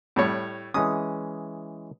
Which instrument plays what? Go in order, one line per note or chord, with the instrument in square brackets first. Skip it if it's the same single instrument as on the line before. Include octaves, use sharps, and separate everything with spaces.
[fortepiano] A2 G3 C#5
[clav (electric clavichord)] E3 G#3 C#4 [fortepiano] D#6